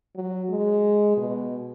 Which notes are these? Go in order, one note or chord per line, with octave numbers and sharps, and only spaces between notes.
F#3
G#3
B2